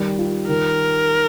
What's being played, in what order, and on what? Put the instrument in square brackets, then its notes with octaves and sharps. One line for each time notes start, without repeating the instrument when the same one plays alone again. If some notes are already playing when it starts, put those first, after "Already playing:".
Already playing: [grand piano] D#3 G3
F4
[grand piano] D#3 [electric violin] A#4